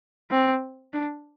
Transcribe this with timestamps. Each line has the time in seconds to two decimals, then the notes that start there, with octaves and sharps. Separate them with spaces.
0.31 C4
0.93 D4